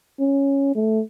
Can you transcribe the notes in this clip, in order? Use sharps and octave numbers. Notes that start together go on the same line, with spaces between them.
C#4
A3